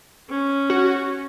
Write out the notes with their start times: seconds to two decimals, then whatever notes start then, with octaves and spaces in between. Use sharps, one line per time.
0.30 C#4
0.70 F#4